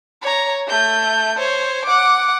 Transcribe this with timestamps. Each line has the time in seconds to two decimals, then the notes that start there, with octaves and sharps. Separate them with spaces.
0.22 C#5 A#5
0.67 A3 G6
1.38 C5 C#5
1.85 F#5 D6